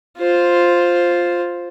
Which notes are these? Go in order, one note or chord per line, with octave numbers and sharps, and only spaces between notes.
F4 C5